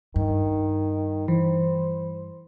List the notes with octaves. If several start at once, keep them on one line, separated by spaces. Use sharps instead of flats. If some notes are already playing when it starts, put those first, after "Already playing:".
G2 D#3
E3 C5